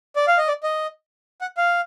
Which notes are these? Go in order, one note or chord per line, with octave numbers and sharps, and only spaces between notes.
D5
F5
D#5
D5
D#5
F#5
F5